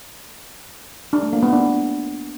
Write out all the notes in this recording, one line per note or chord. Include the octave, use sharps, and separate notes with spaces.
D4
A3
A#3
B3
D4